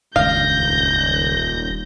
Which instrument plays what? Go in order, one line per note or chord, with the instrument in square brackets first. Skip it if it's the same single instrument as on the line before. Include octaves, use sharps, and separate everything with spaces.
[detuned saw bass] D#1 [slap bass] C#2 G2 [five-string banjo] F5 [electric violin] G6 A#6